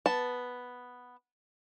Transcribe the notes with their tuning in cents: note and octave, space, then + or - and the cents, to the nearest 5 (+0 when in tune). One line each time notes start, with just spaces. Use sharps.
B3 +0 A5 -5